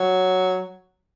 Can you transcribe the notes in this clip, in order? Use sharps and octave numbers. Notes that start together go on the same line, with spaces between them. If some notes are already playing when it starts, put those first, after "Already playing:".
Already playing: F#3